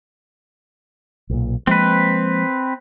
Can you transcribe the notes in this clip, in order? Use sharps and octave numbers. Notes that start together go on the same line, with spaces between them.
B1 A#2
F3 G#3 A#3 C4 B4